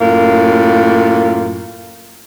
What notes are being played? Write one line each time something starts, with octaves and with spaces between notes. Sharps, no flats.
F#2 A2 A#3 F4